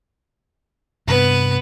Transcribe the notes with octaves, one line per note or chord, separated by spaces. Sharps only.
G2 C3 B3 B4